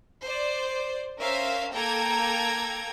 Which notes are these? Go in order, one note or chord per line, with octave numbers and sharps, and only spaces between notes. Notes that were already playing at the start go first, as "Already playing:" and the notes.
C5 D5
C#4 A#4 C5 E5 F5
A#3 A4 G5 A#5 G#6